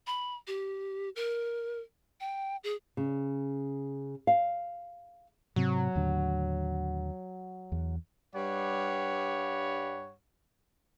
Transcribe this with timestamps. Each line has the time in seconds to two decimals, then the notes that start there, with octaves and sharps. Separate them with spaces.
0.07 B5
0.47 G4
1.16 A#4
2.20 G5
2.64 G#4
2.97 C#3
4.27 F5
5.56 G#2 C3 F#3 C4
5.95 D#2 A2 D3
7.72 E2
8.34 G2 G3 C#5 F#5